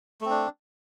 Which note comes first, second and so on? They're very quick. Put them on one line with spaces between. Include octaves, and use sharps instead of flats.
A3 C4 D4